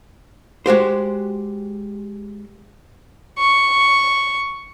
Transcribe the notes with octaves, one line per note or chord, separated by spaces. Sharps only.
G#3 F#4 G4 C5
C#6